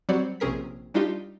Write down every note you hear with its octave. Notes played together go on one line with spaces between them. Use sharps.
F#3 G3 C4 F#4 C#5 D5
A#1 C3 C#4 G#4 A#4 B6
G3 D4 D#4 F4 G4